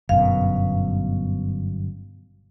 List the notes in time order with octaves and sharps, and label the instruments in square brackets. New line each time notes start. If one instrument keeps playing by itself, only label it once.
[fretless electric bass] G1 F#2 B2 [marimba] F5